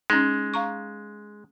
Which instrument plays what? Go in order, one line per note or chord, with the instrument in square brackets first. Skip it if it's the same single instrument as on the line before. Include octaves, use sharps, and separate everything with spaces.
[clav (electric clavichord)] G#3 [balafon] C#4 D#4
[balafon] F5 A#5 C#6